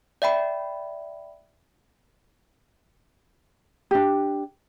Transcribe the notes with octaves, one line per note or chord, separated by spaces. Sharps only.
D5 E5 G5 B5
D4 G4